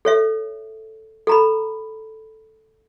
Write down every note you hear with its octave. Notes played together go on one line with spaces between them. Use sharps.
A4 C#5 E5
A4 A#5 B5